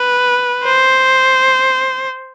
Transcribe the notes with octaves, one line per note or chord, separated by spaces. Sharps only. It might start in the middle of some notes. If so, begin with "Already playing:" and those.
Already playing: B4
C5